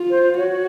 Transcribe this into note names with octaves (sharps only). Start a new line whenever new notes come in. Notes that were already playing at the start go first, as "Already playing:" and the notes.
Already playing: F4
C5
F#4 C#5